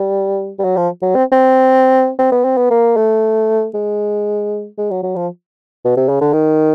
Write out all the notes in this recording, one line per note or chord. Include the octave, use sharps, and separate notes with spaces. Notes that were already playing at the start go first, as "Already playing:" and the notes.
Already playing: G3
G3
F#3
F3
F#3
C4
C4
C4
B3
C4
B3
A#3
A3
G#3
G#3
F#3
F#3
F3
B2
C3
C#3
D3
D#3